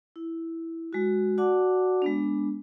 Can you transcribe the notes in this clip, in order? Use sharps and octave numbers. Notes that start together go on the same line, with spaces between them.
E4
G#3 F#4
F#4 D5 F#5 A5 D6
G#3 B3 D4